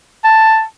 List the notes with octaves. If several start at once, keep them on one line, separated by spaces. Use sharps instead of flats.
A5